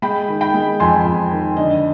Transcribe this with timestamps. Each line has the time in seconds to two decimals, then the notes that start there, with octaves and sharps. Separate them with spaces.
0.02 G#3 G5 B5
0.28 D#3
0.41 G5 B5
0.54 G#3
0.80 F2 G#5 C6
1.05 F2
1.31 D#3
1.57 D3 D#5